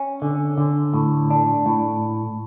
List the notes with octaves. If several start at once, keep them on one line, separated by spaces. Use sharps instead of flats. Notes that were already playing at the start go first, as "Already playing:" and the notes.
Already playing: C#4
D3
D3
A2
D4
A2